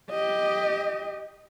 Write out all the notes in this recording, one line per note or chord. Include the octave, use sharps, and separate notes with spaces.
G4 D#5